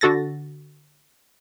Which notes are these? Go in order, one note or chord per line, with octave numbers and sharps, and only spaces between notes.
D3 F#4 A4 A6 A#6